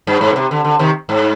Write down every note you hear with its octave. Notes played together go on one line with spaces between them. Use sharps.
G2
G#2
B2
C3
D3
D3
C3 D#3
G#2